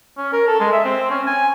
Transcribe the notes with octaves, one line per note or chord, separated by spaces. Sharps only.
C#4
A#4
A4
G#3
E5
C4
C#4
G#5